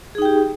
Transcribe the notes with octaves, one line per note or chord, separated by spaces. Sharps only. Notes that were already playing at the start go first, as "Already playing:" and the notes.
D#4 G4 G#4 G5